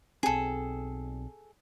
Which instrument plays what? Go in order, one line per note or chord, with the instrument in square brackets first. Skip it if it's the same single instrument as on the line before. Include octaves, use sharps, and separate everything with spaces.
[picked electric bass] B1 C4 [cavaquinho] G#4 A4